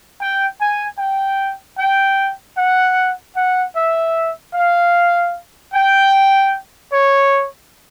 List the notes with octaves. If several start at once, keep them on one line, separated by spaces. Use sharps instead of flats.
G5
G#5
G5
G5
F#5
F#5
E5
F5
G5
C#5